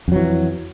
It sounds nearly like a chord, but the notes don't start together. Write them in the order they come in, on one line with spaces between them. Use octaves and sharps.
F2 F#3 E3